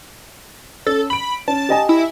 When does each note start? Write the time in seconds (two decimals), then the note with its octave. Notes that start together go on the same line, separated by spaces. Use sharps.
0.86 C#4 A4
1.10 B5 D7 F#7
1.48 C#4 A5
1.69 G4 D#5 G#5
1.89 E4